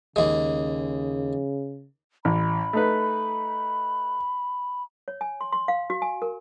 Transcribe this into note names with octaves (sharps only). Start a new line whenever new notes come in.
D#2 C#3 G#3
A1 B5
A3 D#4 B4
C#5
G#5
C6
C6
F5
F#4
G#5
A#4